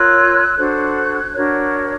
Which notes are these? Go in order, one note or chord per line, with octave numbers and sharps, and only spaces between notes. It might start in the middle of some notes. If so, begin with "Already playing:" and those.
Already playing: F4 A#4 C#5 E6 F#6
D4 F#4 A4 C5 F#6 G#6
D4 F#4 A#4 C#5